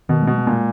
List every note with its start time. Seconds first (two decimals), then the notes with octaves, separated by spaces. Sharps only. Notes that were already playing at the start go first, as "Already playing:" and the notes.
0.09 B2 D#3
0.22 B2 G#3
0.38 G#3
0.47 A#2
0.52 G#3